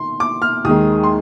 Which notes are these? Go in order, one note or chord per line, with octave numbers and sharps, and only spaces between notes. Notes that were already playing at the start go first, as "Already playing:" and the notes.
Already playing: D#3 C6
D6
F6
D#2 D#3 G#3 D#6
C6